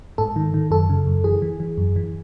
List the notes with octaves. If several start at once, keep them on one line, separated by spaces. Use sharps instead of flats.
G#2 A4
D#3
D#3
F#2 A4
C#3
F#2
E3 G#4
E3
E3
F#2
E3